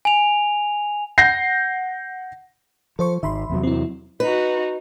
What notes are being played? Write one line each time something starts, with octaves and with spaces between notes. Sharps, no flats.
G#5 F7
F#5 G6 A#6 C7
F3 A4 C5 C#6
G#1 D#3 E5 B5 C6
E2 C3 F#3
C4 E4
D#4 F#4 B4